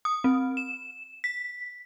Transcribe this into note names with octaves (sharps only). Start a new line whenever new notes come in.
D#6
C4
E7
B6